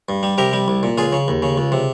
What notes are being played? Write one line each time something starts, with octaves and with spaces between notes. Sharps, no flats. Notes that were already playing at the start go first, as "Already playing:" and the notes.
G2
G3
C3 G4 A#4
G3
C2
A#2
C#2 F4 G#4
C#3
D#2
C#3
C#2
C3